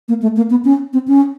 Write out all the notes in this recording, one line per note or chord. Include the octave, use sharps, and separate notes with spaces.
A#3
A3
A#3
B3
C#4
C4
C#4